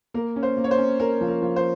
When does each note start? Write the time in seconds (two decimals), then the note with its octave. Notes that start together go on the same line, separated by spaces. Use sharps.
0.14 A#3 A#4
0.36 C#4
0.43 C5
0.57 A#3
0.64 C#5
0.71 C5
0.78 C#4
0.99 C#4 A#4
1.21 F3
1.28 A#4
1.42 F3
1.56 C5